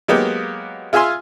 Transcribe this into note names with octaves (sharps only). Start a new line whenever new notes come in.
F#3 G#3 A#3 B3 G4
F4 G#4 E5 F5 G#5 C6